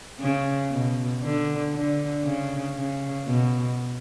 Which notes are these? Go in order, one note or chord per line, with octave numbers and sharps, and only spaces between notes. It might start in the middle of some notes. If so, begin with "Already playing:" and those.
C#3
B2
D3
D3
C#3
C#3
B2